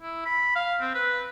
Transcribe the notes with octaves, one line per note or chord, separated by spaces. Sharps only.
E4
B5
F5
C4
B4